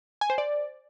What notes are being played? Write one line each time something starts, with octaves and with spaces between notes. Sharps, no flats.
G#5
C5
D5